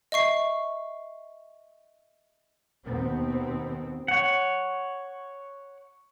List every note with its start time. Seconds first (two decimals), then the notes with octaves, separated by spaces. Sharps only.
0.12 D#5 E5 C#6 C7
2.85 D#2 B2 B3 C4
4.08 C#5 F#5